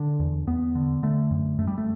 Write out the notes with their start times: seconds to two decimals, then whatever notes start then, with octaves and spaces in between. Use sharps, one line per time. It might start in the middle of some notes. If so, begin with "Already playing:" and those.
Already playing: D3 D4
0.20 E2
0.47 E2 B3
0.75 D3
1.03 D3 A3
1.31 F#2
1.58 F#2 A3
1.67 G3
1.78 A3